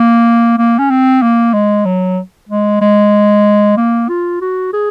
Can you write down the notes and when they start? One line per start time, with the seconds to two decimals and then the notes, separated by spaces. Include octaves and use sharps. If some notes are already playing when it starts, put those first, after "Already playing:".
Already playing: A#3
0.58 A#3
0.79 C#4
0.90 C4
1.22 A#3
1.53 G#3
1.86 F#3
2.49 G#3
2.81 G#3
3.77 A#3
4.09 F4
4.42 F#4
4.73 G#4